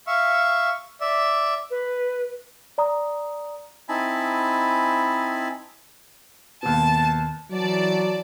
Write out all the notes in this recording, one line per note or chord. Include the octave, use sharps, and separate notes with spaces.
E5 F5 C#6
D5 E5
B4
D5 A#5 D#6
C4 D#4 E4 G#5 A5 B5
D#2 B2 A5
E3 F#3 D5 A5